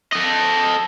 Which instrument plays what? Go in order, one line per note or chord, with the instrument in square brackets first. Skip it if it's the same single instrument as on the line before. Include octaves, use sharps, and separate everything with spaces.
[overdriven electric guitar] A4 D#5